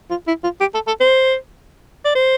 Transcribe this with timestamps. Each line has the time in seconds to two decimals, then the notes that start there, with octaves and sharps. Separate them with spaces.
0.10 F4
0.27 E4
0.43 F4
0.60 G4
0.74 A4
0.87 A4
1.00 C5
2.05 D5
2.15 C5